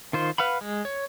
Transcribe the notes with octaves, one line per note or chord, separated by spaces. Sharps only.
D#3 F4 C5
B4 F5 F#5 B5
G#3
C#5